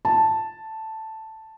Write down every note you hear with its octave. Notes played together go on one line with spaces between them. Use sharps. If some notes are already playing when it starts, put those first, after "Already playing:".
A5